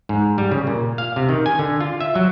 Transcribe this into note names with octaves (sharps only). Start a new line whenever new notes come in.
G#2
G3
C#3
A#2
F5
C3
D#3
G#5
D3
F4
E5
F#3